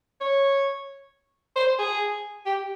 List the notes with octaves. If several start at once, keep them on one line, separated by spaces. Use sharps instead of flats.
C#5
C5
G#4
G4